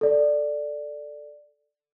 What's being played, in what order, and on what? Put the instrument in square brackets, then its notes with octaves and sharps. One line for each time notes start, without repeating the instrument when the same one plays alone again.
[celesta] A4 D5